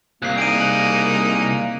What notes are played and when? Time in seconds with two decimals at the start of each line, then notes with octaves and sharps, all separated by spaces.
0.22 C2 A#3 F#6 C7
0.38 D#4 G#4 D7 D#7
0.60 F#6 F#7